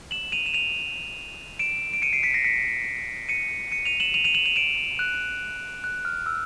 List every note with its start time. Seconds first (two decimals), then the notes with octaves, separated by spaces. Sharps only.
0.11 E7 F#7
0.32 D#7 F7
0.46 E7
0.54 D#7 F7
1.59 D7 E7
1.94 D7
2.02 C#7 D#7
2.13 C7 D7
2.23 B6 C#7
2.34 A#6 C7
2.44 B6 C#7
3.29 C#7 D#7
3.72 C#7 D#7
3.85 D#7 F7
4.00 E7 F#7
4.14 D#7 F7
4.24 D#7 F7
4.35 E7 F#7
4.46 D#7 F7
4.56 D7 E7
4.99 F#6
5.84 F#6
6.05 F6
6.26 E6